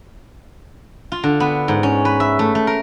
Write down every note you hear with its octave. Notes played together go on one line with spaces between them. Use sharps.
F4
D3
B3
G#2
C#4
B4
E5
A3
A3
A#4